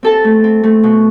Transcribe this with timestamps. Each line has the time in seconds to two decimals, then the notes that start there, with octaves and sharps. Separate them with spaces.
0.03 C4 A4 A5
0.24 A3
0.44 C4
0.63 A3
0.83 B2